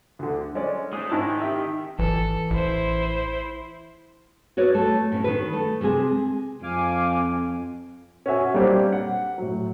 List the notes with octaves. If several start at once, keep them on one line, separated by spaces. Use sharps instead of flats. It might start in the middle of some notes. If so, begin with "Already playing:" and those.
D2 D3
G#3 C#4 D5
G#3 D#4 D#6
G#2 D#3 E4 A5
G4 E5
G#1 E3 A4
A1 E4 C5
F#4 B4 C#5 D5
A3
A2 C#4
D#3 B4
A3
C3 G#3 C4 G#4
F2 F5 G#5 D6
C#4 F#4 E5 G#5
G3 A#3 C4 D4 G4
F#5
A2 F#3